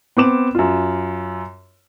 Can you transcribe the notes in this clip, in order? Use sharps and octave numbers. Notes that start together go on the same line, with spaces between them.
B3 C4 D6 E7
F#2 F4